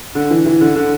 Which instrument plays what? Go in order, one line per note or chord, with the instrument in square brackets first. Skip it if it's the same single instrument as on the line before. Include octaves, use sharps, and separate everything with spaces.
[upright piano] D3
E3
E3
D3
D3